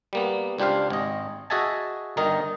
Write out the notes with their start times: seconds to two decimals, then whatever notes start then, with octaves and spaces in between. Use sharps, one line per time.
0.13 G3 A#3 B3
0.58 C#2 D4 G4 C5 F5
0.90 G#1 D#5
1.50 F#4 G#4 D#5 E5 G#5 A5
2.17 G1 D#3 D#4 A#4 D#5